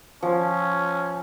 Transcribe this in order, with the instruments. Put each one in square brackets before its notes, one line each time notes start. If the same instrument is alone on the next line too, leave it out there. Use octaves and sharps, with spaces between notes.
[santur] F3 [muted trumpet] C#4